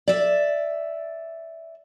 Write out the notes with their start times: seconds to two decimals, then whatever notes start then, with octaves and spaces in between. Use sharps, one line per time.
0.08 D5 E5